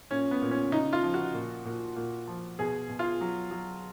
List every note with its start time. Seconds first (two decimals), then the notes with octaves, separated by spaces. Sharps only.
0.11 A#2 C#4
0.31 B3
0.42 A#2
0.51 C#4
0.72 C#3 D#4
0.93 F4
1.03 F3
1.14 F#4
1.34 A#2
1.65 A#2
1.96 A#2
2.27 F3
2.59 B2 G#4
2.89 B2
2.99 F4
3.21 F#3
3.51 F#3